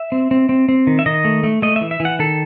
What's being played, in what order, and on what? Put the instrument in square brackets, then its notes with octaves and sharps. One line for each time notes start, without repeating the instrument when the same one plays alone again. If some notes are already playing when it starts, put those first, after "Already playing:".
Already playing: [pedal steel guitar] E5
C4
C4
C4
C4
D#3
E5
D#3 D#5
A3
A3
A3 D#5
E5
E3
E5
E3
F#5
D#3 A4